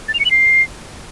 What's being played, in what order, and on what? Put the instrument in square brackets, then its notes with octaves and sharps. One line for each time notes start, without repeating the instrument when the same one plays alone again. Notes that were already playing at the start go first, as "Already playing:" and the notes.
[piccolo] A6
F7
C#7
F#7
C7